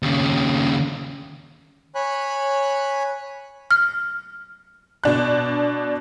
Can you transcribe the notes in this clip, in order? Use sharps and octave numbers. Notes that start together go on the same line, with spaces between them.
D#2 C#3
C#5 G#5 B5 F#6
F6
B2 D4 F#6